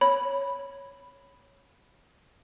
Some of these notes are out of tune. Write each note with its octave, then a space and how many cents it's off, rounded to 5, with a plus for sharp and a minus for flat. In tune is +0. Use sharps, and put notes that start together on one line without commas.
C#5 +0 B5 +0